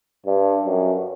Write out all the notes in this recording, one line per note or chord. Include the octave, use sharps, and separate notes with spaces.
G2
F#2